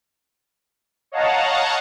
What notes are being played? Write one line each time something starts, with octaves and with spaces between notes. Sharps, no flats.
C#5 D#5 F5 F#5 A5 A#5